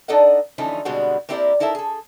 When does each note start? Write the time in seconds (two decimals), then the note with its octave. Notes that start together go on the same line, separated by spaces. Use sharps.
0.08 D4 D#4 A4 D5 D#5 F#5
0.58 D3 E3 F3 A3 C#4 D#4
0.85 B2 D3 G3 G#3 C4 F#4
1.29 A#3 C4 E4 G4 A#4 D5
1.60 D#4 E4 A4 A#4 E5
1.75 G#4 A4